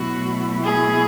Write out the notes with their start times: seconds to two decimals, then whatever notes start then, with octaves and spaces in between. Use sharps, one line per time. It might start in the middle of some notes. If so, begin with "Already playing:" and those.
Already playing: B2 F#3 A3 E4 F#4
0.63 G#4